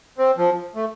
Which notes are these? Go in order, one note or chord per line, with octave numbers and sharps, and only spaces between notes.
C4
F3
A3